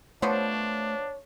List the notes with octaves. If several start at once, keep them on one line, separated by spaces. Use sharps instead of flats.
F3 A3 B3 D4 C5 C#5